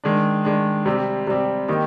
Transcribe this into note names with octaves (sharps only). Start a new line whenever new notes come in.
D#3 G#3 D4
D#3 G#3 D4
C3 G3 C4 G4
C3 G3 C4 G4
D#3 A#3 D#4 G4